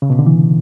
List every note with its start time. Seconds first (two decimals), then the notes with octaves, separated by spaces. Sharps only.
0.02 C#3
0.10 B2
0.19 D3
0.26 E3